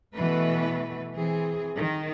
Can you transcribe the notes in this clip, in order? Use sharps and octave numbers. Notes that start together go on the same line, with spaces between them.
B2 E3 A3 B4
E3 C4 G#4
D#3